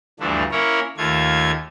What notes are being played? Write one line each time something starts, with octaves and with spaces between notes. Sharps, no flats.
D2 G2 E3 F3 A3 D4
A#3 C#4 E4 A#4 C#5
D#2 A3 F4 G#6